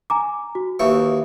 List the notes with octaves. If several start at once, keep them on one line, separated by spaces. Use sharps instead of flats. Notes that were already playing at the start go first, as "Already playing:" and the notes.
G#5 A#5 D6
F#4
D#2 E3 C#6